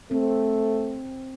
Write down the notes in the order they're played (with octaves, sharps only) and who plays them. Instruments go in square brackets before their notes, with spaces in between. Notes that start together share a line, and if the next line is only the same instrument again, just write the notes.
[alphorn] A3 [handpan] C4